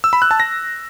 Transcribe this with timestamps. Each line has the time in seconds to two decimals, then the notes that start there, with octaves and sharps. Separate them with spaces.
0.04 E6
0.13 B5
0.22 F#6
0.31 A5
0.40 A#6